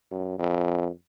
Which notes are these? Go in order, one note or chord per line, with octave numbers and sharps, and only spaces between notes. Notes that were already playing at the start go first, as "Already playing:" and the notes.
F#2
F2